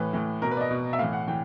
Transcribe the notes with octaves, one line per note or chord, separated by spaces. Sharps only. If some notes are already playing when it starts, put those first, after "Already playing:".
Already playing: A2 E3 B4
A2 E3
B2 A#4
B4
D5
D#5
B2
E5
A2 E3 F5
F#5
E3 G5